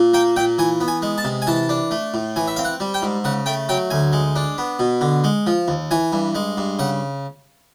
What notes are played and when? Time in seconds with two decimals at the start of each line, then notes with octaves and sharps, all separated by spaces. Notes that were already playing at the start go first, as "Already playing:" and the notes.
Already playing: A#2
0.14 A#3 G5
0.36 A#2 G5
0.58 E3 G#5
0.81 B3
0.88 G#5
1.02 G#3
1.18 A5
1.24 C3
1.42 G#5
1.47 E3 A5
1.69 D4
1.91 A3
2.14 A2
2.36 E3 G#5
2.48 E5
2.56 C4 F5
2.65 F#5
2.80 G3
2.94 G5
3.02 G#2
3.24 C#3 F#5
3.46 A3 G5
3.69 F#3 G5
3.91 D2 G#5
4.13 G#3
4.36 D4
4.58 B3
4.79 B2
5.01 D3
5.24 G#3
5.47 F3
5.68 D#2
5.91 E3 G#5
6.12 G2
6.35 G#3
6.57 G2
6.79 C#3 F#5